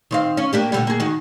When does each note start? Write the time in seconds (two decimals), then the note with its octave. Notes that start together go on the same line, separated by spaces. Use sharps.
0.11 D#3 C4 F5
0.37 C#4
0.53 A#3 D4 G4
0.72 A#2 D3 G3
0.87 A#3 G#4
1.00 D#3 F#4